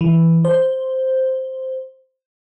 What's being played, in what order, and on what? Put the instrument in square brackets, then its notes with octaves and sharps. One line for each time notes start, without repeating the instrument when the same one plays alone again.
[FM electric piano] E3
C5